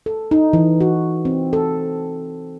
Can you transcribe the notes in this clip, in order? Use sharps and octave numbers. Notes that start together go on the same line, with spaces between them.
A4
D#4
E3
F#4
C4
A4